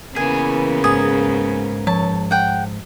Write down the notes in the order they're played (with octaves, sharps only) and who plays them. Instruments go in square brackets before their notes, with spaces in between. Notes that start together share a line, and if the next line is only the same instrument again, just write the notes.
[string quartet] C#3 A#3 B3 [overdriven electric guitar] E3 G#4 [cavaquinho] G#5
[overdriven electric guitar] G#2 [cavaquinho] G#4 D#6 [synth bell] G#6
[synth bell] F3 [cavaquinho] A5
[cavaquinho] F#5 G5